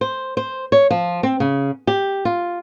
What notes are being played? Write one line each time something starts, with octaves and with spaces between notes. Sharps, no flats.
C5
C5
C#5
F3
C4
C#3
G4
F4